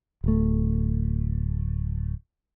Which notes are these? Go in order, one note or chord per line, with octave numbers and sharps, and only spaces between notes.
D1 A3